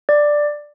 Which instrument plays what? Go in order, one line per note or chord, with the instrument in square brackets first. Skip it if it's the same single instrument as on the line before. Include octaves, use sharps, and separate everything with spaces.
[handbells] D5